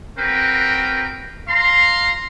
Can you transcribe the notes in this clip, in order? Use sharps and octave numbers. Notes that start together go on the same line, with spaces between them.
C4 F#4 A#4 B4 G5
F5 A#5 C6